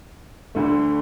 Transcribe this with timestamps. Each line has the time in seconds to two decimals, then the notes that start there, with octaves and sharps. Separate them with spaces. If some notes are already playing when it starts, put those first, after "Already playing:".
0.55 D2 D3 A3